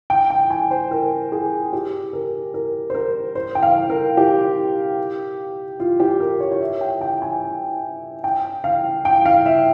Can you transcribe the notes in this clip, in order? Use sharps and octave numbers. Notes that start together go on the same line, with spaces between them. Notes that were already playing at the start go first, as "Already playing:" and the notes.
G5
G5
G#5
C5
A#4
G#4
G4
A#4
A#4
C5
A#4
C5
G5
F5
A#4
G4
F4
G4
A#4
C#5
C#5
E5
G5
G5
G#5
G5
F5
G5
F5
E5